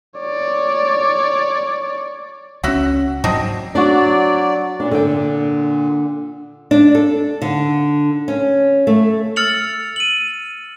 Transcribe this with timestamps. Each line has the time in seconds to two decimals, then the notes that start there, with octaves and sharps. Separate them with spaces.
0.20 C#5 D5
2.64 C#2 C#4 F#4 E5 F#5
3.24 G#2 F#3 C4 D4 D#4
3.75 F#3 D4 F#4 D5
4.80 A#2 D4
4.91 D3 G5
6.71 D4
6.95 A4
7.42 D3
8.28 C#4
8.87 A3
9.36 E6 F6 A6 C#7 F7 F#7
9.96 D#7 F#7